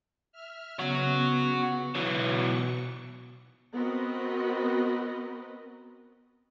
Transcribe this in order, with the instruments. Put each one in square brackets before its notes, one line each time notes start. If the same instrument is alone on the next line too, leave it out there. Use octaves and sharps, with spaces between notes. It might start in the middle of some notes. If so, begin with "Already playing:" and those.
[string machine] E5 F6
[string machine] C#3 B3 [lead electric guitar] F#4 C#5
[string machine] B2 C#6 [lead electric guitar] E3 F#3
[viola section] B3 C4 F#4 A#4 B4 D#5